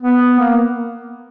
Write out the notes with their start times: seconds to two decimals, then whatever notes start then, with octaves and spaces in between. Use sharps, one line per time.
0.02 B3
0.39 A#3